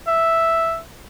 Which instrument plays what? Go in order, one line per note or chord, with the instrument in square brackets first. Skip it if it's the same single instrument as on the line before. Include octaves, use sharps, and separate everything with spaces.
[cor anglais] E5